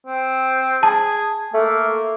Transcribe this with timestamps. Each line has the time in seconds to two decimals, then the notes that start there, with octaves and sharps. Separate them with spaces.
0.06 C4
0.83 G#4 A5
1.54 A3 A#3